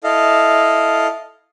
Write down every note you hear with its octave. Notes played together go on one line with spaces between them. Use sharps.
E4 A4 D#5 F5